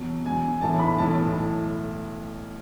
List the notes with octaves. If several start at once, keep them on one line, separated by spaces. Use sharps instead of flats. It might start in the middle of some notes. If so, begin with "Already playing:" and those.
Already playing: E2 B2 F#3
E2 B2 F#3 G#5
B1 A2 E3 A5
B5
B1 A2 E3 A5